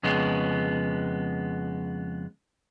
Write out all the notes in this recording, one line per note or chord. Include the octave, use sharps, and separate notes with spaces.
F2 C#3 G#3 B3